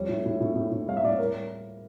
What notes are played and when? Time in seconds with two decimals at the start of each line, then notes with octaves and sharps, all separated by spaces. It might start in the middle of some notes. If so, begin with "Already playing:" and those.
Already playing: F2 G3 C#5
0.09 A2
0.26 A2
0.41 A2
0.56 A2
0.72 A2
0.87 G3 F5
0.97 E5
1.03 A2 D5
1.11 C#5
1.18 G3 A#4